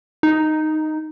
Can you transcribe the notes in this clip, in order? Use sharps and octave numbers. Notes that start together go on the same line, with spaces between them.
D#4